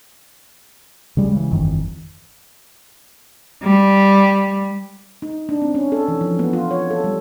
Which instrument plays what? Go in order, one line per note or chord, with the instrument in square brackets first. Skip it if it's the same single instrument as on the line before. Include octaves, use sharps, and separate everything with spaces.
[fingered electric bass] C#3 G3 G#3
C#3 E3
G1 F2 D#3 E3
[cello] G3
[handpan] D#4
D4
C4
C#4
A4
E3
F3
B3
F4
C#5
A4
G3